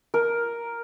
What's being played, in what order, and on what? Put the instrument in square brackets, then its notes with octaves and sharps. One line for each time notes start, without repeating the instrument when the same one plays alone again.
[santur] A#4